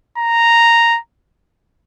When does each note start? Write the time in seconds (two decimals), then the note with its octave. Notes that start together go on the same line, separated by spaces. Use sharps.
0.18 A#5